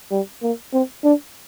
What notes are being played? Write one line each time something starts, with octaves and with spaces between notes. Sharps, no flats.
G3
A#3
C4
D4